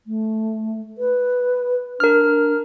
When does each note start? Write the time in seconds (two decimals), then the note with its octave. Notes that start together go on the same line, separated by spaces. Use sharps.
0.07 A3
0.98 B4
2.00 D4 A#4 F6